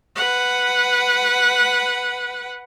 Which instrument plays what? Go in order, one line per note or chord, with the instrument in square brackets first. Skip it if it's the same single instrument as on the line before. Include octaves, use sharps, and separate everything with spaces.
[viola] B4 F#5